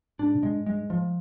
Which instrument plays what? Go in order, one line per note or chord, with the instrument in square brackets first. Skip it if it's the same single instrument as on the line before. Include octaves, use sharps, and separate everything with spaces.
[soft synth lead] G#2 [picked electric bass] D4
[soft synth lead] C3
[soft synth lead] G2 [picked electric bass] G#3
[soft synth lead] G#2
[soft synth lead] G2 [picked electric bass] G#3
[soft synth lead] G#2
[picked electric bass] F3